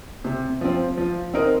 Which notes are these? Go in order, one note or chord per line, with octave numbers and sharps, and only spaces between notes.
C3
F3 C4
F3
C4 D#4 A#4 D#5